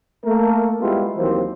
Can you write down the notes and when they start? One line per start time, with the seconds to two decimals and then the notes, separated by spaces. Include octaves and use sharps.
0.25 A3 A#3 A#4
0.80 G3 G#3 B3 E4 F4 G4
1.17 D#2 E3 F#3 A#3 C4 C5